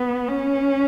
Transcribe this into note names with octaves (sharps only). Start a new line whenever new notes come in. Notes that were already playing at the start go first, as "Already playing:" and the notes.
Already playing: B3
C#4